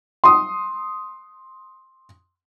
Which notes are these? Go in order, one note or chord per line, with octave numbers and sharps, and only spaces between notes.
C6 D#6